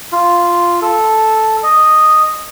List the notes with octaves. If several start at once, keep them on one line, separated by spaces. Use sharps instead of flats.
F4
A4
D#5